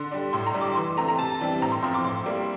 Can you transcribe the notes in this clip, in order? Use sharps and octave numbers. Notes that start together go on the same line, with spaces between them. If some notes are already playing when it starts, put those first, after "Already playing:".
Already playing: D3 C6
G3 D4
A2 C6
A#5
G3 D4
D6
E3 C6
A3 C4 A#5
A#5
C3 A5
E3 G3 C4
A2 A#5
C6
F3 C4 C6
D6
A2 C6
G3 A#3